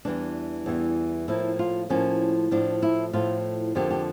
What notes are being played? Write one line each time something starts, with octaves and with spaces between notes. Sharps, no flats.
E2 E3 G3 D4
E2 E3 G3
A2 F3 A#3 E4
F4
A2 F3 A#3 C#4
A2 F3 A3 D4
E4
A2 F3 A3 F4
F2 D3 F3 A#3 G4
G4